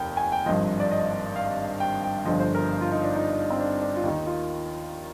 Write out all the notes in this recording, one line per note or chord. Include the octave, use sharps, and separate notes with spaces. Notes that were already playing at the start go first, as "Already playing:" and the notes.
Already playing: F1 D#2 G5
G#5
G5
G#1 G2 F3 D#5
D5
D#5
F5
G5
G5
G1 G2 D3 F3 D#5
C5
A#4
F4
D#4
D4
D#4
C4
D4
D4
F4
D#2 D#3 D#4
F4